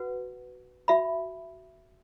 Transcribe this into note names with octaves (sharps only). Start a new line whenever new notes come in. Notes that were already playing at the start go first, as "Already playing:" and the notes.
Already playing: F#4 B4 F#5
F#4 E5 B5